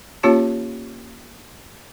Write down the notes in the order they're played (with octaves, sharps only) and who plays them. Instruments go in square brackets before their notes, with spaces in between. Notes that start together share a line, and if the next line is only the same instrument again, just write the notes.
[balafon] A#3 C#4 F4 G4 C#5 A5